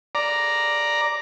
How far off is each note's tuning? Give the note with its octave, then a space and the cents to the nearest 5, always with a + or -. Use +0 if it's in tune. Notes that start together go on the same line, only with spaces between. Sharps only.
D5 +0 A#5 +0